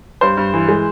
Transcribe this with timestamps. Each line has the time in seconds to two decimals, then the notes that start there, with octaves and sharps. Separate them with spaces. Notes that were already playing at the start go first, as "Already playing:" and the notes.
0.21 G2 C5
0.37 G2
0.54 E3
0.69 G#3